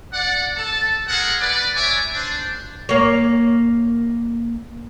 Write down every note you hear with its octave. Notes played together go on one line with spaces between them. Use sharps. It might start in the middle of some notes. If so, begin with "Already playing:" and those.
D5 F#5
A4 A5
C4 G#4 A#4 F#5
B4 D5
C#5 D5 E5 G#5 C#6 D6
D4 C5
A#3 C#5